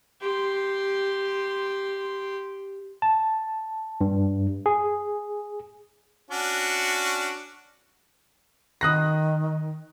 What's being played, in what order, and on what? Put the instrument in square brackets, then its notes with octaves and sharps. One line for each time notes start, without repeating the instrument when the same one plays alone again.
[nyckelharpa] G4 C6
[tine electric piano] A5
G2
G#4
[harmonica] C#4 D4 F#4
[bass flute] D#3 [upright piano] D#6 F#6 A#6